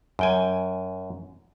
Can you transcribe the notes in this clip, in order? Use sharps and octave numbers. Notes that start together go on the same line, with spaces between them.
F#2 G5 G#5